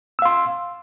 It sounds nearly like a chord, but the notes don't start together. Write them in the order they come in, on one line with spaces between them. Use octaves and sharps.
E6 F5 C6